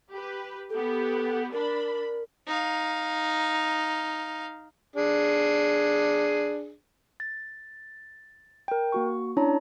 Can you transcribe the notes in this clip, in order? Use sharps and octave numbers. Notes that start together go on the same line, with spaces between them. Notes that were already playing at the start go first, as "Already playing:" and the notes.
G4 B4
B3 G4 A4
D4 A#4 B5
D#4 F5
D4 G#4
A6
A#4 G5
A#3 F#4 C#6
C#4 D4 E4 C#5 A5 A#5